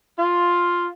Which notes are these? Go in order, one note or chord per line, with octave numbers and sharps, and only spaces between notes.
F4